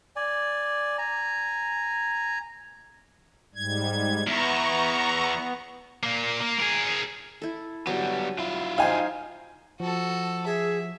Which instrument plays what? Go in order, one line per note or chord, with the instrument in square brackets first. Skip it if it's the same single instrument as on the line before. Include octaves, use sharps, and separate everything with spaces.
[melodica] D5 G#5
G#5 A#5
[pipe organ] G#2 G3 G#6
[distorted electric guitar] E2 [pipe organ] B3 [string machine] A#5 C#6
[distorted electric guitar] A#2 A#3
A#3
G#4 A#4
[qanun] E4 A4
[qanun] F#3 [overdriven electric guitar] G3 B3
[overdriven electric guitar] E4 F4
[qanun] D#4 C5 [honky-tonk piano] F5 G#5
[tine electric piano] F3 [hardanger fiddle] F#4 A4
[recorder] G#4 [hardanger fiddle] E5